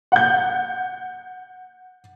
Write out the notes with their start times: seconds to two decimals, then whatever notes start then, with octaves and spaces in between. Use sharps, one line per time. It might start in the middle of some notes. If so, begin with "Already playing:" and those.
0.12 F#5 G6